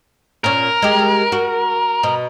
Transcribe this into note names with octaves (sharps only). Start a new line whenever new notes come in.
A#2 C#4 A#4
G#3 G4
F#4
B2